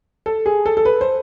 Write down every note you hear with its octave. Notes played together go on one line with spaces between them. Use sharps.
A4
G#4
A4
A4
B4
C5